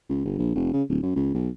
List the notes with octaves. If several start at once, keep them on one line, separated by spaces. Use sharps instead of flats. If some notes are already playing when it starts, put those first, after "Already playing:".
C#2
G1
A#1
F1
C#3
D1
F#2
C#2
B1